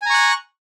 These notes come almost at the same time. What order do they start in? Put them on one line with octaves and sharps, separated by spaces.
G#5 A#5 C#6 F#6